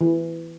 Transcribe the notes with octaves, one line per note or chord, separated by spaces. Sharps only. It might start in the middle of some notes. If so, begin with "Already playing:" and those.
E3